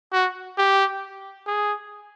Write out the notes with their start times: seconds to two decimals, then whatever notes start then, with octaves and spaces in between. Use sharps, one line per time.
0.13 F#4
0.58 G4
1.47 G#4